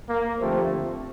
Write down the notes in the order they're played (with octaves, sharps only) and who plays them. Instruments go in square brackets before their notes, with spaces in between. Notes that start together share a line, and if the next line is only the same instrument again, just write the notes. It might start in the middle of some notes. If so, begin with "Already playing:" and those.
[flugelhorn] A#3
[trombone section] D3 F3 C4 G4 C5 [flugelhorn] A3